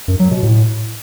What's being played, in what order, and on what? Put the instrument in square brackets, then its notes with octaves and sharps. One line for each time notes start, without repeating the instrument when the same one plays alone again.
[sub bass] F#2
F#3
B2
A2